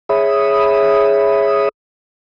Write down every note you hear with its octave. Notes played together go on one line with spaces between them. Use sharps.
G#4 C#5 E5 B5 D#6